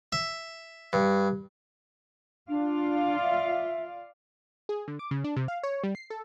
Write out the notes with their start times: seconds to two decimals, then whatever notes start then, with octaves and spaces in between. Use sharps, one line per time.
0.12 E5
0.93 G2
2.49 D4 F4 D5 F5
3.22 E5
4.69 G#4
4.88 D3
4.99 D6
5.11 C#3
5.24 D4
5.37 C3
5.48 F5
5.63 C#5
5.84 G3
5.95 C7
6.10 A4